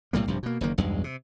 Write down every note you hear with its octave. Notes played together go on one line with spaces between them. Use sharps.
B1 A2 G3 A#3
A#1 G2 C3
B2 A#3
F#1 D#3 A#3
B1 E2 G2 G#3
C3